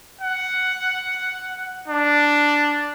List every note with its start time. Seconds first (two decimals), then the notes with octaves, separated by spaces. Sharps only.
0.21 F#5
1.88 D4